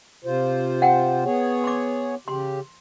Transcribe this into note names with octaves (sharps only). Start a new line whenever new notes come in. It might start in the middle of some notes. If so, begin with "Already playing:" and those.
C3 F4 C5
F#5 G5
B3 G#4 C#5
C6 D6
C#3 G4 C6